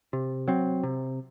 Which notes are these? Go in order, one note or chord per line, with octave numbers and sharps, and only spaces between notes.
C3
F#3 C4
C3